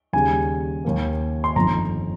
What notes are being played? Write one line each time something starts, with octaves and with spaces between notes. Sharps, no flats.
D#2 C#3 G3 G#5
D#2 D#3 A#3
C6
G1 F2 D#3 A#5